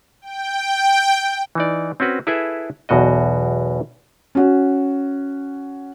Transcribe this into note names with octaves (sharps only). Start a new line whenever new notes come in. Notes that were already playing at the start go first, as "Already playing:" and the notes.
G5
E3 D#4 D5
C4 C#4 F#4 B4
E4 G#4 A4 B4 E5
B1 E2 B2 F#4 D#5
C#4 F#4